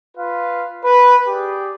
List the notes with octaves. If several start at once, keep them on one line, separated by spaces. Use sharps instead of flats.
F4 B4 F5
B4
G4 G#4 D5